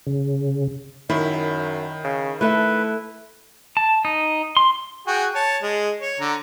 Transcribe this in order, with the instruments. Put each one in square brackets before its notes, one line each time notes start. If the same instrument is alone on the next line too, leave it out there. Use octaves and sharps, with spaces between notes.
[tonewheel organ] C#3
[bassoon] F#2 [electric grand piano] D#3 B5 [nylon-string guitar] E4
[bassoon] C#3
[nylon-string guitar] A3 A4 E5 [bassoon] E4 [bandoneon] B4
[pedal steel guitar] A5
D#4
C6
[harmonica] F#4 G#4 G5
C#5 A5
G#3
C#5
D3 A#5